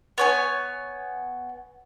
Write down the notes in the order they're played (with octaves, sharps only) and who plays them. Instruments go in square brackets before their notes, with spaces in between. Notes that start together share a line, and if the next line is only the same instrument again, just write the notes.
[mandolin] B3 C#5 G#5